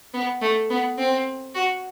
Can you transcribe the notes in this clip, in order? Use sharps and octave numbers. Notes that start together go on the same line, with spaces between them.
B3
A3
B3
C4
F#4